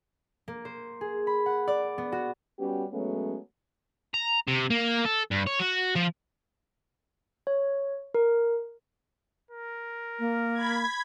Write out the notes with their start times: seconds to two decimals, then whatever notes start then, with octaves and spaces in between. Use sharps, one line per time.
0.48 A#3
0.65 C5
1.01 G#4
1.27 B5
1.46 F#5
1.68 D5
1.98 B3
2.12 F#4
2.59 G3 B3 C#4 F#4 G4
2.92 F#3 G#3 A3 B3 C#4
4.14 A#5
4.48 C3
4.70 A#3
5.05 A4
5.31 G2
5.47 C#5
5.60 F#4
5.95 F3
7.47 C#5
8.15 A#4
9.51 A#4
10.19 A#3
10.53 B5 G#6